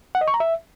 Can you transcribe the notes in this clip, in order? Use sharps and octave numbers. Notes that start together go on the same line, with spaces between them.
F#5
D#5
C#6
A#5
E5